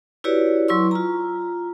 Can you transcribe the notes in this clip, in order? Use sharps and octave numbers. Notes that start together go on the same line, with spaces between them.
E4 F#4 G4 B4 C#5 D5
F#3 E4 C6 C#6 E6
F4 A#5